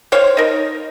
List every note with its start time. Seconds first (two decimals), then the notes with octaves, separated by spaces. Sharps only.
0.12 C5 C#5 F5
0.37 D#4 A#4